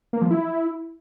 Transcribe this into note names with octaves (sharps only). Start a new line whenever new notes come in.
A#3
F3
E4